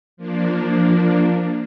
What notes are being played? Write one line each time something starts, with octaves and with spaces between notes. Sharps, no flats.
F3 A#3 D4